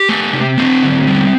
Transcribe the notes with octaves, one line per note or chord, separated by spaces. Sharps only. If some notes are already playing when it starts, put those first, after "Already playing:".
Already playing: G4
A3
C3
A3 C4
D3
G3